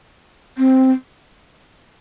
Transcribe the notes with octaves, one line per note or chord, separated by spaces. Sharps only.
C4